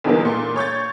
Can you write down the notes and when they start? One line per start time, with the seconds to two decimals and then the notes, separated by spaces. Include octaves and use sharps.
0.04 B1 E2 D3 E3 G3 A#3
0.25 A#2
0.56 C#5 C#6 G6 A6